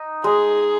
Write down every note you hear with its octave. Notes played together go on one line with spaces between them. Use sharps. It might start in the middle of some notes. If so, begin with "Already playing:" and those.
Already playing: D#4
G#3 G#4